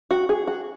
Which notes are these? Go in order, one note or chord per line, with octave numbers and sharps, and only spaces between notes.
F#4
G#4
F#4